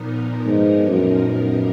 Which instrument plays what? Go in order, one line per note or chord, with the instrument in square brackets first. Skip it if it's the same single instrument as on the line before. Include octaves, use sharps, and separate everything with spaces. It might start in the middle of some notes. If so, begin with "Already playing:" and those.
Already playing: [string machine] A#2 F3 B3 D#4 A#4
[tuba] G#2
F#2
F#2